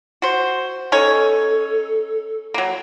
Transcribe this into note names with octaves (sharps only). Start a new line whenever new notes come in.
F#4 C5
C#4 D#4 A4 C#5
F#3 A#3